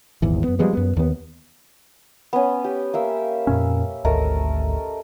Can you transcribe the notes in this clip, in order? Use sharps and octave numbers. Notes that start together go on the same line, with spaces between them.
D#1 G#1 E2 E3
F#2 B3
F3 G3 G#3 B3
F#2 B3
D#2 B3
B3 C#4
G4
A#3 E5 E6
F2 A#2 C#4
G#1 D2 A3 A#4 D#5